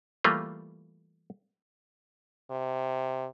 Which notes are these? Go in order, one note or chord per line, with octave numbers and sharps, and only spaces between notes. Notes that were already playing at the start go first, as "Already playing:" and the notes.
E3 G3 A3 A#3 F4
C3